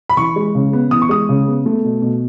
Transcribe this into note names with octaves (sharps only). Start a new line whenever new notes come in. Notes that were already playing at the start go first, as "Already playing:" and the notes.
B5
E3 C#6
G#3
C#3
B3
E3 D#6
C#6
G#3 D#6
C#3
B3
A3
B2
B2